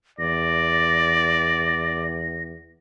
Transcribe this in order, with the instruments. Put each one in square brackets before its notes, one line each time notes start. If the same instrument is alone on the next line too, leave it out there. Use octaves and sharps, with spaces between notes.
[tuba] E2 [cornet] D5 [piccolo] A#6